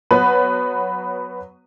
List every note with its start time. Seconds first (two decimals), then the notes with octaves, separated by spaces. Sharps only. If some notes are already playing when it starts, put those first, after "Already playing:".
0.11 F#3 B3 B4